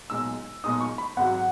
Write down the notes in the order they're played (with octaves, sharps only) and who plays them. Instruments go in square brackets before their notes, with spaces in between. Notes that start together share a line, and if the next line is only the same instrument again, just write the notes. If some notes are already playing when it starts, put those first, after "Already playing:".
[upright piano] B1 A#2 G#3 D#4 [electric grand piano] E6
[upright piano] B1 A#2 G#3 D#4 [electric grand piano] D#6
[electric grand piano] C#6
B5
[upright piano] G#1 G#2 F#3 [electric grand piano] F#5